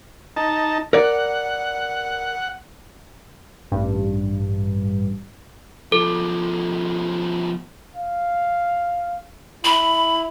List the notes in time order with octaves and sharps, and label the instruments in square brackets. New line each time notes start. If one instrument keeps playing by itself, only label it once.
[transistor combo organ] D#4 A5
[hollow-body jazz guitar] A#4 D5 [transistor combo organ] F#5
[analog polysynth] A1 G2
[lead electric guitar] B2 F3 [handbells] A4
[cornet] F5
[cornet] E4 [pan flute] B5